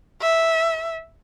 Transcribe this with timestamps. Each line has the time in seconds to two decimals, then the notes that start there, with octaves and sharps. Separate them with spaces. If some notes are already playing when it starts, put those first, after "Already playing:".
0.21 E5